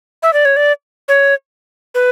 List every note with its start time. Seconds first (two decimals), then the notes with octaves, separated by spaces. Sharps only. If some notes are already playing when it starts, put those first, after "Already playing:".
0.23 E5
0.33 D5
0.45 C#5
0.57 D5
1.08 C#5
1.95 B4